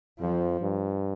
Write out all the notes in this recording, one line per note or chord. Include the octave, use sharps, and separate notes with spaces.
F2 F3
G2